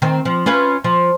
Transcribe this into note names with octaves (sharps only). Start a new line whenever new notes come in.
D#3 C4
F3
C#4 F4 B4
F3